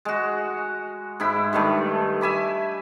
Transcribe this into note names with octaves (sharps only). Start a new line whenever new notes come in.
G#3 F#4
G#2 E4 B5
G2 D#3 A3
E5 G#5 B5 D6